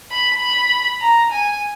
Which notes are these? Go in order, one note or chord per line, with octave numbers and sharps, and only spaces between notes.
B5
B5
A#5
G#5